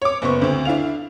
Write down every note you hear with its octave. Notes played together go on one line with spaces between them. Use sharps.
C#5 D6
F#1 B3 C5 C#6
D2 C4
D4 E4 F5 F7